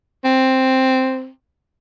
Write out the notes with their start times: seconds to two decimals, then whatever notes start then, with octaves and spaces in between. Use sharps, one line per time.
0.24 C4